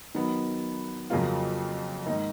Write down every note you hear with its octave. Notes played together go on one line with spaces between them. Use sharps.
D#3 F#3 B3
F2 C#3 F#3 A#3 F4
G#2 D#3 A#3 D#4